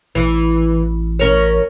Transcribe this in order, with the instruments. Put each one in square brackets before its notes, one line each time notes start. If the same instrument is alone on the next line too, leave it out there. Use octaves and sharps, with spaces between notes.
[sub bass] A1 [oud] E3
[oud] C#4 A#4 C#5